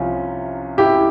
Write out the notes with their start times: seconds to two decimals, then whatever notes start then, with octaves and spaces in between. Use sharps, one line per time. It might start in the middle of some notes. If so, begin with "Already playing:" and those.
Already playing: C2 C3 F3 C#4 F4
0.78 E4 G4